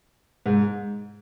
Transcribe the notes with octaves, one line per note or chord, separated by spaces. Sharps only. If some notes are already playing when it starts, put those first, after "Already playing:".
G#2